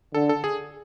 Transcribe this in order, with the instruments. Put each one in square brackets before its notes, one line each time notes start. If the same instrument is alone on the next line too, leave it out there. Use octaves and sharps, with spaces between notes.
[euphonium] D3 [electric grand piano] A4
[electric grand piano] A4
G#4